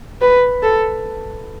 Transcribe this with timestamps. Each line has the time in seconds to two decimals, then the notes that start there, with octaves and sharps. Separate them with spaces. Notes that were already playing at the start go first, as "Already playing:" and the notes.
0.21 B4
0.63 A4